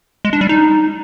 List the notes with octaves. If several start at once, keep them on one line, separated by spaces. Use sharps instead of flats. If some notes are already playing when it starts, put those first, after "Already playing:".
G#3
D4
G3
D#4